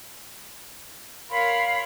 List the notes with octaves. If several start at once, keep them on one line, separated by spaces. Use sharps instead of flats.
A#4 C#5 F5 B5 C6